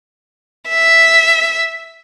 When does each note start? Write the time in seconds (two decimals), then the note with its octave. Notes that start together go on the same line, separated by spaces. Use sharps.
0.69 E5